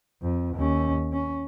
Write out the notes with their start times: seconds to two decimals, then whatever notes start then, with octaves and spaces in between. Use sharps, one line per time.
0.22 F2
0.56 D#2 C#4
1.13 C#4